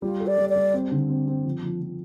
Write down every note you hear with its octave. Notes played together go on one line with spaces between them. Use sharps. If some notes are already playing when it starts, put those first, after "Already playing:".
G3 F4
A4
D5
G3
D5
G3
C4
D3
C4
C4
F3
F3
F3